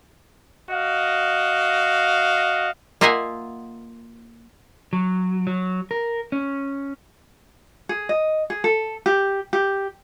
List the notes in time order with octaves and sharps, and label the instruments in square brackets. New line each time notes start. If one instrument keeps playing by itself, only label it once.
[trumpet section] F#4 D#5 F5
[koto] A#3 F4 D#5 E5 F#5 G#5
[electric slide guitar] F#3
F#3
A#4
C#4
[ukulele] G#4
D#5
G#4
A4
G4
G4